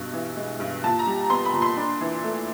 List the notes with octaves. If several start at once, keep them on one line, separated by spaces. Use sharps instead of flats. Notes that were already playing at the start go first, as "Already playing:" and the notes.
Already playing: G2 B2
E3
G#3
G2
A#2 A5
A#5
G3
B3 C6
B5
A#2
C6
D4
E3
A3